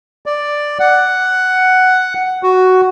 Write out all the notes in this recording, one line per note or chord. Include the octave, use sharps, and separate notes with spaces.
D5
F#5
F#4